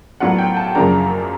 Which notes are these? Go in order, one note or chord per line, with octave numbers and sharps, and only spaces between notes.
A2 F#3 B3 D4 F4 F#5
G5
A5
F#2 C#3 F3 A#3 D4 A#5